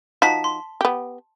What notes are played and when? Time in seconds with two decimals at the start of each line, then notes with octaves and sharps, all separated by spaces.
0.22 F3 D#4 F#4 A5 B6
0.44 C6
0.81 B3 G4